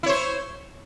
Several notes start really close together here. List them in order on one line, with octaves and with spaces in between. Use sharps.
E4 C#5 C5